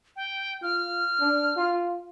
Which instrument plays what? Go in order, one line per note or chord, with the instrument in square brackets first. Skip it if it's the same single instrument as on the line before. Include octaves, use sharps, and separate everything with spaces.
[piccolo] G5
[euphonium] F4 [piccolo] F6
[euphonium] D4
F4